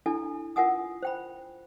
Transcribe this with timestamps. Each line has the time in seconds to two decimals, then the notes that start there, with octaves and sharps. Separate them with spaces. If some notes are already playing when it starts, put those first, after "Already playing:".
0.06 D4 E4 A4 G#5
0.56 F4 A#4 F#5 G#5 D#6
1.03 C5 G5 B5